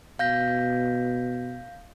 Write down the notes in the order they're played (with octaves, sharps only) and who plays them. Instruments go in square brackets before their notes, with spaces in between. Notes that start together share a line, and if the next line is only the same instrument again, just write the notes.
[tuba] B2 [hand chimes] F5 G6 A#6